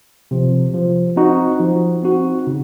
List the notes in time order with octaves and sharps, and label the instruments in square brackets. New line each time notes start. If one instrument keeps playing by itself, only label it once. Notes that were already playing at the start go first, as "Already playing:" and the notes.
[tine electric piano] C3 F3
F3
C4 D#4 F#4
F3
C4 D#4 F#4
C#3